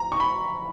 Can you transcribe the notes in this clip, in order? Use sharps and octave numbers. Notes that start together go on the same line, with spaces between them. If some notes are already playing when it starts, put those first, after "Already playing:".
Already playing: A#5
C#6
B5